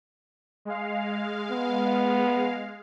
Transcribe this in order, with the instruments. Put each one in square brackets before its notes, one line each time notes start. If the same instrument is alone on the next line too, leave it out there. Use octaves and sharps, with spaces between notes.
[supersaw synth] G#3 F5
[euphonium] B3